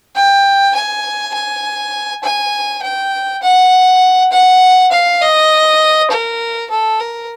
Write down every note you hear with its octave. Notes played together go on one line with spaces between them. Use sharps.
G5
G#5
G#5
G#5
G5
F#5
F#5
F5
D#5
A#4
A4
A#4